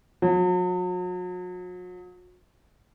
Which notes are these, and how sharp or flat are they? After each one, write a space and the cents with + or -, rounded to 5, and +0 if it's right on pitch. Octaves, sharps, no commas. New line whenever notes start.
F#3 -40